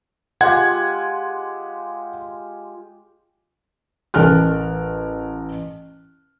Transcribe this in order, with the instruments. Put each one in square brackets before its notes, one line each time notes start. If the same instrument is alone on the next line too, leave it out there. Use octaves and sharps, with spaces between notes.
[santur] G#3 F4 G4 [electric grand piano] F#5 G#6
[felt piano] A1 A#4 A5 F6 F#6